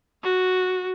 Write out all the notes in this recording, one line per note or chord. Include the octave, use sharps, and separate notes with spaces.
F#4